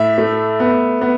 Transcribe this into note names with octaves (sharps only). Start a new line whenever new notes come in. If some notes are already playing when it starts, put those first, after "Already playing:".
Already playing: A2 E5
A3
B3
B3